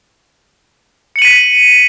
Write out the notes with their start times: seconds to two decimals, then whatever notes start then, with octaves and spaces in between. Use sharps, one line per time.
1.16 C#7
1.19 F#7
1.22 D#7
1.25 B6